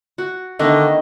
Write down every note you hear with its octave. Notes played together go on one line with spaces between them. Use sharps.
F#4
D3 D#3 A3 B3 D#5